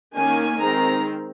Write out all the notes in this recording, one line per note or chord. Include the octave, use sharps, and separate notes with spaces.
D#3 A#3 C#4 G#5
D#3 G#3 C4 A#5